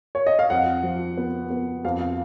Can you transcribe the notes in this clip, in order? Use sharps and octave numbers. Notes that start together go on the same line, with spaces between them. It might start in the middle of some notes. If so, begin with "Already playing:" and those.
C#5
D#5
F5
F2 F#5
F3
B3
B3
F2 F5
F5